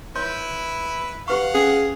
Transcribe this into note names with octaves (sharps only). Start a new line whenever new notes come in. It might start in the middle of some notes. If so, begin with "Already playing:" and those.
E4 B4 C#5 C6
G4 B4 F5 F#5 C#6
C#4 G#4